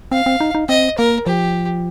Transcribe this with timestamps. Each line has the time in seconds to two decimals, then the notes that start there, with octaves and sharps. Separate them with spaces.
0.12 C4 F5
0.26 C4
0.40 D#4
0.55 D#4
0.69 C4 D#5
0.98 A#3 A#4
1.27 F3 G4